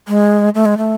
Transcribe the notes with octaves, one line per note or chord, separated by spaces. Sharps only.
G#3
A3
G#3
A3